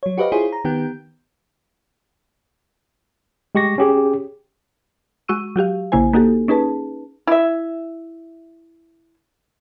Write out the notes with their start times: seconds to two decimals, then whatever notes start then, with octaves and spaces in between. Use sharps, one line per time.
0.03 F#3 C#5
0.18 F#4 G4 B4 C5 D#5 F5
0.32 E4 F4 G#4 C5 C#5
0.52 A#5
0.65 D#3 B3 G4 G5 G6
3.55 G#3 G4 C#6 A#6
3.78 C#4 G4 G#4
5.28 G#3 F#4 C#6 E6 D#7
5.56 F#3 F#4 G4 F5
5.92 A#1 C#3 A#3 E4 C5 G#5
6.13 A#3 D#4 F#4 G4 A4
6.48 C#4 D#4 G#4 B4 A5
7.27 E4 E5